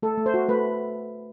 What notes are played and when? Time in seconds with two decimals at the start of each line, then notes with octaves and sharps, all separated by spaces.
0.02 A3 A4
0.18 A3
0.26 C5
0.34 F#4
0.49 A3 B4